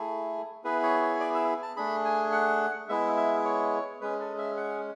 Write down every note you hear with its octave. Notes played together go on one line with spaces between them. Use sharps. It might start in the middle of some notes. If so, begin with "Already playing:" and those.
Already playing: A3 E4 G#4 A4
B3 E4 G#4 B4
C#5
C#5
D5
E5
A5
A3 D4 G#4 B5
G#5
F#5
G#3 B3 E4 G#4 E5
E5
C#5
G#3 C#4 G#4 B4
A4
E5
F#5